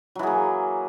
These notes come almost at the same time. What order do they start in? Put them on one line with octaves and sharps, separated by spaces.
F#3 E3 G#4 A#3